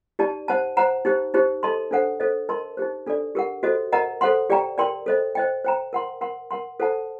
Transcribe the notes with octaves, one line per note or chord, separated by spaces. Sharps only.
D#4 G4 D5 A5
C5 F#5 A5
C5 F#5 A#5
D#4 G4 C5
D#4 G4 C5
A4 D#5 A5 C6
D4 A4 C5 F#5
A4 C5 D#5
A#4 D#5 A5 C6
D#4 G4 C5
D4 A4 D5
G4 A#4 F#5
F#4 A4 C5 D#5
A#4 D#5 F#5 A#5
A4 C5 F#5 C6
G4 D5 G5 A#5
A#4 D5 G5 C6
A4 C5 D#5
C5 D#5 G5
C5 G5 A#5
A#4 F#5 C6
A#4 F#5 C6
A#4 F#5 C6
A4 C5 F#5 A5